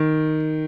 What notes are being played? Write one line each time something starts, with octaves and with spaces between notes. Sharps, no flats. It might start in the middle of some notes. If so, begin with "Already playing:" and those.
Already playing: D#3